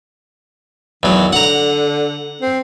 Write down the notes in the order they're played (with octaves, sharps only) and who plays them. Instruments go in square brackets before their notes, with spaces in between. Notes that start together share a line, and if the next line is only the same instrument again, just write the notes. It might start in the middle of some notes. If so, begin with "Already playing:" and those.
[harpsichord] E2 F#3 [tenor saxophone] D#3
[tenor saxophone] D3 [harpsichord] F#5 A#5
[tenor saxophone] C4